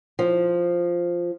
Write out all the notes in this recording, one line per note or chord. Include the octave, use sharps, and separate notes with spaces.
F3